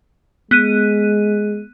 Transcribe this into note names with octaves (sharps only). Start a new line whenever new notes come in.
G#3 B3 F#6 D#7